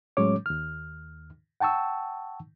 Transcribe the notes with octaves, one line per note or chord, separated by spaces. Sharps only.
A2 F#3 G#3 C#4 C#5 D6
D#2 F6
F#5 G5 A5 C#6 E6